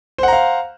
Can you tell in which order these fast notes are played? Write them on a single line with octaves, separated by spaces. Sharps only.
C5 F#5 A#5 F5